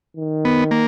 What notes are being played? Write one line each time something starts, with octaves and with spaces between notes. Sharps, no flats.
D#3
B3
A#3